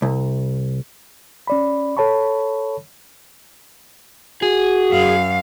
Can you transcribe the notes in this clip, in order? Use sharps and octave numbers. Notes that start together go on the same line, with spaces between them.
C2
C#4 D5 B5
A4 C#5 A5 B5 C#6
F#4 G#4
F#2 F5